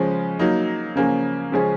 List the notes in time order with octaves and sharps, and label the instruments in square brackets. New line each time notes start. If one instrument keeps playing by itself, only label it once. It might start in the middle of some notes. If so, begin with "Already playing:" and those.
Already playing: [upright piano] C#3 F3 G#3 C#4
F#3 A#3 D#4
C#3 F3 A#3 C#4 G#4
C#3 F3 G#3 C#4 G#4